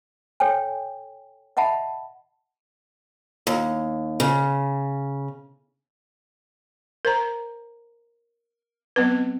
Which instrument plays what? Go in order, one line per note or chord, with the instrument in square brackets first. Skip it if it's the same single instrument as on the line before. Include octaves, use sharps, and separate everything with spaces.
[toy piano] A4 C#5 G5 G#5
D#5 E5 F#5 A5 B5
[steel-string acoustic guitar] D#2
C#3
[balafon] A#4 C5 A#5
F#3 B3 C4 B4